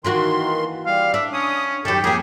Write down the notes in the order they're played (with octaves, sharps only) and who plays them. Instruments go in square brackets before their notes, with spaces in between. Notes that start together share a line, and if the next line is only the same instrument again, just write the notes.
[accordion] D#3 C6 [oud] E3 A#3 F#4
[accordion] G3 [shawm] F5
[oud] D4 [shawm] E5
[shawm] C#4 [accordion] D#6
[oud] F#2 D#3 [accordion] G4 [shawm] A4
[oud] F2 A#3 [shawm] G#4